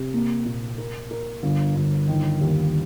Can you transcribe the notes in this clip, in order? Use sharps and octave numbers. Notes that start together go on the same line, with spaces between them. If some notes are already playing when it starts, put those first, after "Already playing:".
Already playing: C3
A#3
A#2
A#4
A#4
G1
G1
D#3
D#2